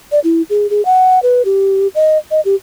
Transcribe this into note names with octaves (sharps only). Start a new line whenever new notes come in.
D5
E4
G#4
G#4
F#5
B4
G4
D#5
D#5
G4